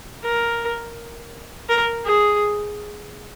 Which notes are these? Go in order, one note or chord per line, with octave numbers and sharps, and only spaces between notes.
A#4
A#4
G#4